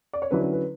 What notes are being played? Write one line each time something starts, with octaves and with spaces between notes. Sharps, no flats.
D5
C#5
D3 F#3 C#4 E4 B4
B4
B4